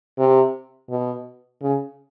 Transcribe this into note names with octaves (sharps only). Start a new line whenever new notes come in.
C3
B2
C#3